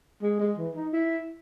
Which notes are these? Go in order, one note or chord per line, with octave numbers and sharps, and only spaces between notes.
G#3
G#3
E3
D#4
E4